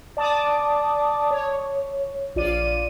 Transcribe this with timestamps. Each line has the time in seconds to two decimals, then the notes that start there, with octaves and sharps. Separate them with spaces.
0.17 D5 A5 D6 D#6
1.31 C#5
2.35 A#1 F4 D5 D#7